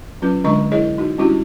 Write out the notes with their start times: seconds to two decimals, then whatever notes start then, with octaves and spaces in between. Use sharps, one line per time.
0.22 F#3 C#4 F4 B4
0.44 D3 G#3 D4 D#5 C#6
0.72 E4 G#4 A#4 C#5 D#5
0.98 D#4 F#4
1.18 G3 C#4 D4 E4 F#4 G4